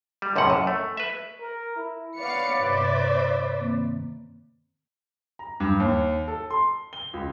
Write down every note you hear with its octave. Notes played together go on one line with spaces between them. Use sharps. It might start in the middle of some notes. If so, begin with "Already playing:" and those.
G3
C#2 F#2 A2 C3 F#5
F#2
A3
B4 E5
A#4
E4
B3 B4 C#5 D5 F5 C#7
G2 C3 C5 E5
D#3 A#3 C4
A#5
G2
D#2
A4
C6
G7
C#2